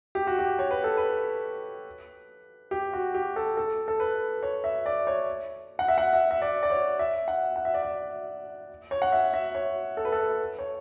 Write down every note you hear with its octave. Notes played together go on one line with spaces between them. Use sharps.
G4
F#4
G4
C#5
B4
A4
B4
G4
F#4
G4
A4
A4
A4
B4
C#5
E5
D5
C#5
F#5
E5
F#5
E5
E5
D5
D5
C#5
E5
F#5
F#5
E5
D5
E5
C#5
F#5
E5
E5
C#5
A4
B4
A4
C#5